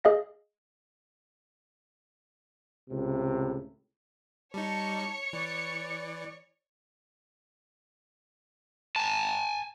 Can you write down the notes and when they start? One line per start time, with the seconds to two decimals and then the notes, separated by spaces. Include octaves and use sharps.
0.04 G#4 D#5 F5 A#6
2.90 C#2 A2 C3
4.54 G3 D#4 C#5 A5 C#7
5.33 E3 D5
8.96 G#5 A5